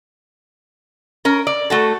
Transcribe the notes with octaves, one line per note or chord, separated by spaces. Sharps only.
C#4 A#4
D5
A3 F#4 A4